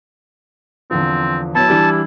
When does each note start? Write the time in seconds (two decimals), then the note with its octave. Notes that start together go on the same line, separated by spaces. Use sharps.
0.91 E2 D3 F3 C4
1.55 F#3 B3 E4 A5
1.68 E3 G3 D4